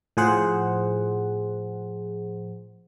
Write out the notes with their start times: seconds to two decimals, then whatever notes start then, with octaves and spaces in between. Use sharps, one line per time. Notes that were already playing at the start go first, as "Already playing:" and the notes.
0.17 A2 F3 G#4 C5 F#5